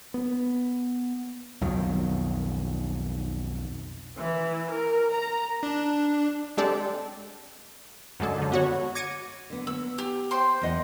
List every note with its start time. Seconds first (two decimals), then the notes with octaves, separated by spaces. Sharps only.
0.14 B3
1.61 B1 F2 D#3 F#3
4.18 E3
4.69 A#4
5.11 A#5
5.63 D4
6.57 G#3 C4 D4 G4 A4 D5
8.20 F#2 D3 G#3 A4
8.38 F#2 D3
8.52 B3 F#4 C#5
8.95 D6 G#6 A#6 C#7 D#7
9.50 D3 B3
9.67 B3 E6
9.98 G4
10.31 C5 G5 C6
10.61 E2 D#5 F#5